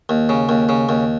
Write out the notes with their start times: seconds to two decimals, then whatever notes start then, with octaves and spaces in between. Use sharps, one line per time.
0.09 D#2
0.29 C#3
0.49 D#2
0.69 C#3
0.89 D#2